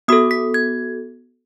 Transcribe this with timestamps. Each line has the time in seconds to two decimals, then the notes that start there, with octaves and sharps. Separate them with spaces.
0.08 B3 F#4 A4 D#6
0.31 B6
0.54 G#6